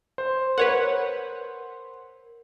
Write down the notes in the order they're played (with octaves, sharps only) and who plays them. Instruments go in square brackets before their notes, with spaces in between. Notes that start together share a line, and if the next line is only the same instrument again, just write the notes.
[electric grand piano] C5
[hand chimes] A#4 [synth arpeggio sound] B4 C#5 F#5